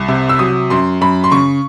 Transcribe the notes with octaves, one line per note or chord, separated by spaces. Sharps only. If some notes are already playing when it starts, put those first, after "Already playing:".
Already playing: C2
C3
E6
F#3 D#6
F#2 C6
F#2 B5
C6
C#3 C#6